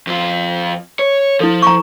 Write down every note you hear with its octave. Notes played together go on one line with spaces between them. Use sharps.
F2 F4
C#5
F3 E4 A4
A#5 C#6